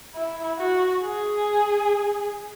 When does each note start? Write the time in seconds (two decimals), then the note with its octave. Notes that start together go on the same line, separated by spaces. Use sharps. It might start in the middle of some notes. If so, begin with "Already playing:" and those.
0.15 E4
0.58 F#4
1.03 G#4